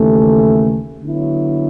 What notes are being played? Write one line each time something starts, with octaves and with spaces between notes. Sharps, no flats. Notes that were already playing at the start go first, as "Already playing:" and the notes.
Already playing: D#2 C#3 E3 A3
D3 F#3 B3 E4